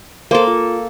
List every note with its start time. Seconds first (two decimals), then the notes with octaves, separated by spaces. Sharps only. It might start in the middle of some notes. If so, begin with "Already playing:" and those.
0.31 A#3 A4 A#4 C5 C6
0.48 F4